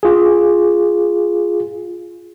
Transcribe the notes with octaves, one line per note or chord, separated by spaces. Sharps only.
F4 G#4